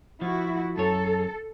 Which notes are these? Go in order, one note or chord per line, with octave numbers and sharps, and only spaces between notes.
F3 E4 F#4
F#2 A4 C#5